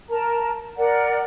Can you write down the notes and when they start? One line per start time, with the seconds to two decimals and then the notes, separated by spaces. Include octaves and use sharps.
0.08 A#4 A5 A#5
0.77 A#4 D5 F#5